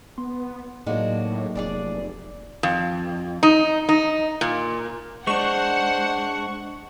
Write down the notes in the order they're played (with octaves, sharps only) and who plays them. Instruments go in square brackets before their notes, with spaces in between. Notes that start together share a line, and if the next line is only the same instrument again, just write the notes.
[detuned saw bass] B3 [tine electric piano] C6
[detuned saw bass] A2 [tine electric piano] F#3 A#3 D#4 [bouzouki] G#3 D4 F#4
[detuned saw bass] F1 [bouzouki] D4 G#4 D5
[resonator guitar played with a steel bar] F2
D#4
D#4
A#2
[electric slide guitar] G#3 D4 [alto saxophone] C5 [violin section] F#5 [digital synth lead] C#6